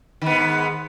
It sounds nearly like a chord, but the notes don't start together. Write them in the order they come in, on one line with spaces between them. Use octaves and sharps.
D#3 B3 G#2